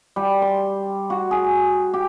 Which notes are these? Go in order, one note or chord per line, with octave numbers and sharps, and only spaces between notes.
G3
C6
F#4
G#4
G4